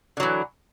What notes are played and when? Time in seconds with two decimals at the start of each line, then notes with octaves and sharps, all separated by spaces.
0.17 D3
0.20 F#3
0.23 E3